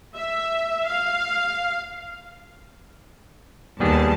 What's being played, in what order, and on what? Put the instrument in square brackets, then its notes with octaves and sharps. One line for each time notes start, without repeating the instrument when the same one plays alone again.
[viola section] E5
F5
[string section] D#2 A5 [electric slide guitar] G3 B3 G#4